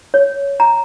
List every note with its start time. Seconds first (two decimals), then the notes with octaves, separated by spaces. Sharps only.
0.14 C#5
0.60 A#5